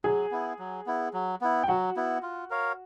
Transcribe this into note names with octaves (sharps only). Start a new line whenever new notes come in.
F#3 G#4 G#5
B3 E4
F#3
B3 E4
F#3
B3 E4
G5
F#3 F#4 F#5
B3 E4
F4
A#4 C#5 F5